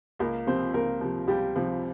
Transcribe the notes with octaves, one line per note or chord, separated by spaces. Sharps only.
C#2 A#3 A#4
C3 F3 C4 C5
C#2 A#3 A#4
C3 F3
C#2 G3 G4
C3 F3